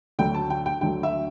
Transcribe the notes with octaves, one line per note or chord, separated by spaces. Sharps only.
D2 D3 F#3 A3 G5
A5
G5
G5
D2 D3 F#3 A3 G5
E5